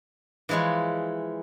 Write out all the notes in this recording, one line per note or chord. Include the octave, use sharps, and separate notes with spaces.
E3 F3 G#3 E4 C#5